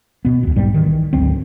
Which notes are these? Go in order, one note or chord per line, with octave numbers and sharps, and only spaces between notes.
B2 B3
E1 D#2
B1 G#2 G3
D#3 E3
G#1 D2 F#3 C4